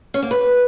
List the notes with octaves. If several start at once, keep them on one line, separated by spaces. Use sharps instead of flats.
C#4
A#3
B4